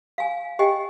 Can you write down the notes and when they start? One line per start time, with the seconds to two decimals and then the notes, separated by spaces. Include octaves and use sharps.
0.18 F5 G#5
0.59 G4 D#5 G5 G#5